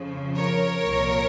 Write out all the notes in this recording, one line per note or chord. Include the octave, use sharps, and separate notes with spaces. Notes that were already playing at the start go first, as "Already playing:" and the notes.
Already playing: F2 C#3 F3
A#4 C#5
C2 A#2 F3